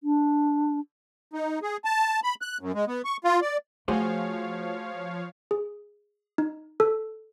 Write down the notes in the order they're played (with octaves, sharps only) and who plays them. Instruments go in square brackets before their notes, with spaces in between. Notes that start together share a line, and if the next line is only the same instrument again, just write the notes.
[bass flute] D4
[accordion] D#4
G#4
A5
B5
F#6
F#2
G#3
B3
C#6
F4
D5
[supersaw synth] F3 C#5 F5 [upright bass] A3 [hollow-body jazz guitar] F#4 G#4 C5
[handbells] G#4
D#4
A4